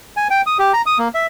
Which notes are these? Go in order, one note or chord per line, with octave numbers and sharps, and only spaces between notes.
G#5
G5
D#6
G4
A#5
D#6
A#3
E5